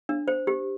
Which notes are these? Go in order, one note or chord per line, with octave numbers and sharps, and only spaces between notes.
D4
C5
G4